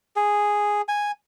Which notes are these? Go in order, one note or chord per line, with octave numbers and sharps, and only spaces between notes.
G#4
G#5